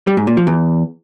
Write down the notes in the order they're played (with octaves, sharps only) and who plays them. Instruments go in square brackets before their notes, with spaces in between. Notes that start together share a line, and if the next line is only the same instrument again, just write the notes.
[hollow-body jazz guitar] G3
G#2
A#2
F3
E2